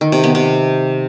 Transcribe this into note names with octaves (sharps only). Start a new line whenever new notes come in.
D#3
C3
B3
C3